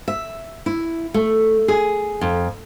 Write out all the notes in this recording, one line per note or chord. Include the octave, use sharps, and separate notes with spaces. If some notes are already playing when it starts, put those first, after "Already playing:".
E5
E4
A3
G#4
F2